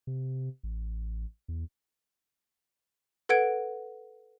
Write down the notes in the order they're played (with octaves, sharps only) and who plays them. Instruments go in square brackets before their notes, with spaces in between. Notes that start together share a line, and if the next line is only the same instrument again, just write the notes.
[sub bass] C3
A1
E2
[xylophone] A4 B4 F#5 G#6 D7